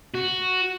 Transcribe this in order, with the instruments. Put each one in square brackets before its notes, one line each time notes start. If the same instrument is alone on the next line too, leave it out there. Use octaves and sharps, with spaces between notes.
[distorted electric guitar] F#4